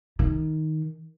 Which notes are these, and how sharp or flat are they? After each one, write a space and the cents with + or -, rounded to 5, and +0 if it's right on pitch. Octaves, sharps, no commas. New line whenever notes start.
D#3 +10